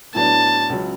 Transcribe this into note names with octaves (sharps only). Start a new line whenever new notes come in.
A2 F#3 B3 D4 A5
C#2 C#3 F#3